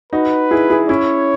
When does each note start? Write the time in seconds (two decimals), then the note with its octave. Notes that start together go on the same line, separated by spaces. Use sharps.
0.13 D#4 F#4 B4
0.51 E4 G#4
0.70 E4 G#4
0.89 C#4 E4 C#5